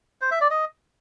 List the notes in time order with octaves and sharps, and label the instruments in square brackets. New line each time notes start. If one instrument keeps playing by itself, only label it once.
[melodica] C5
E5
D5
D#5